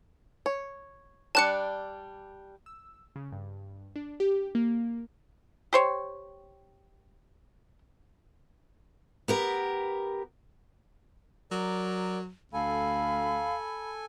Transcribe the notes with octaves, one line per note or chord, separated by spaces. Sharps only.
C#5
G3 D4 D5 A5 F#6 C#7
E6
C#3
G2
D4
G4
A#3
G4 C5 C#5
B3 G4 A#4
F#3 A#4 D5
D2 A4 F5 G#5 B5